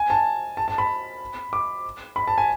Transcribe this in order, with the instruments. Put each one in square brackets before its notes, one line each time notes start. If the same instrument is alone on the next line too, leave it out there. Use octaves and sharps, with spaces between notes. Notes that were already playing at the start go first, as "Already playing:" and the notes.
Already playing: [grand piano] G#5
A5
A5
A5
B5
D6
B5
A5
G#5